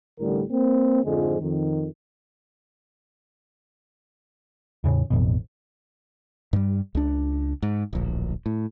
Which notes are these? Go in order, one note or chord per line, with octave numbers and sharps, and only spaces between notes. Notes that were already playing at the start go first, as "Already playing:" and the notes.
A1 A2 D3 G3 A#4
A#3 C4
F2 G#2 D3 F3 G#3
F2 D#3
E2 A2 C#3
A1 F2 B2
G2 G3
C#2 D4
G#2
D1 A#1
A2